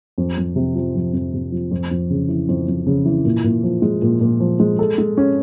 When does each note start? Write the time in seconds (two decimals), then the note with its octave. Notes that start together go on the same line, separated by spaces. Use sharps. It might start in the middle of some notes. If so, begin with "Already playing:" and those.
0.18 F2
0.37 F2
0.56 C3
0.75 F3
0.95 F2
1.13 F2
1.34 C3
1.52 F3
1.71 F2
1.91 F2
2.10 C#3
2.28 E3
2.49 F2
2.68 F2
2.86 C#3
3.05 E3
3.25 A#2
3.44 A#2
3.63 F3
3.82 G#3
4.02 A#2
4.21 A#2
4.40 F3
4.60 G#3
4.79 A4
4.98 G#3
5.17 C#4